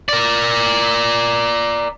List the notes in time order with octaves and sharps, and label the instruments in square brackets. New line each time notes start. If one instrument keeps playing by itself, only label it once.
[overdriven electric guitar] A#4 D5